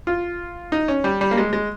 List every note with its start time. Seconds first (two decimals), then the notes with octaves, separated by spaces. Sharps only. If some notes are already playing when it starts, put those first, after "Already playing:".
0.07 F4
0.72 D#4
0.88 C#4
1.04 G3
1.21 G3
1.31 A#3
1.38 G#3
1.53 G#3